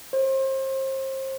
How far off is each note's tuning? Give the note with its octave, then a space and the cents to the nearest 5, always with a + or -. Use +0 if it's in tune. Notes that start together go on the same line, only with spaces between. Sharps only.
C5 +35